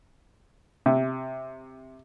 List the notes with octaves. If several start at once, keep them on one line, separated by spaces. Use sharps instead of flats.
C3